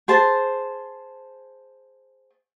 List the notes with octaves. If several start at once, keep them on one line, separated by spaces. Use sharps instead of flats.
G#4 C5 A5